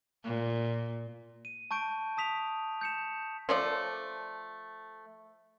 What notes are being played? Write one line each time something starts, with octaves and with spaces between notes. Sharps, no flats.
A#2
D#7
A5 C#6 G6 D7
A5 D#6 B6 F7
G6 C#7 E7
F3 A3 D5